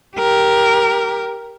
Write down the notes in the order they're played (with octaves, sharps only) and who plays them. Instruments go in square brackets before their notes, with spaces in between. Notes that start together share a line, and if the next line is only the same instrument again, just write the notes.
[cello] G4 A#4